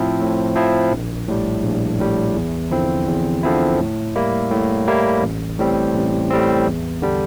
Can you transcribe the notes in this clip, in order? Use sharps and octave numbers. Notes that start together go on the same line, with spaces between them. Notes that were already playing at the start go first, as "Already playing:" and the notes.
Already playing: A2 F3 C4 E4
A2
F3 C4 E4
A#1
A2 G3
A#1
A2 G3
E2
D3 F3 C4 E4
E2
D3 F3 C4 E4
A2
G3 A#3 E4
A2
G3 A#3 E4
A1
A2 G3 C4
A1
A2 G3 C4
E2
D3 G3 D4